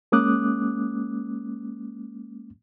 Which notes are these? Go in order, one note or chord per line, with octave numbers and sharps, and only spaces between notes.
G#3 A#3 C#4 D6 D#6 F#6